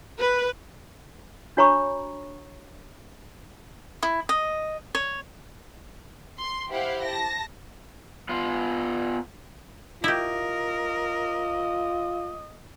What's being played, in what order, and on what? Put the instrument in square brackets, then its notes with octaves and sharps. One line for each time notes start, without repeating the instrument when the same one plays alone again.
[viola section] B4
[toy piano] D4 F#4 C#5 A#5 B5 C#6
[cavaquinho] E4
D#5
C#5
[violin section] C6
E4 G4 C5 F5 F#5
A5 A#6
[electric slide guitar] B3 F4 F5
[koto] E4 G4 [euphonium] F4 [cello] A#4 [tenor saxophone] D#5